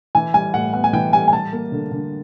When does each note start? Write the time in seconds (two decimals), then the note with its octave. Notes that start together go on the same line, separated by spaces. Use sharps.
0.15 E3 G#5
0.34 G3 G#5
0.54 A2 F#5
0.73 B3 F#5
0.84 G#5
0.93 E3 G5
1.13 G3 G#5
1.28 G#5
1.33 G3 A5
1.52 A#3
1.72 D3
1.92 D3